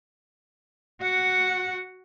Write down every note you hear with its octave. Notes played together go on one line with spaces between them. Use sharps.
F#4 F#5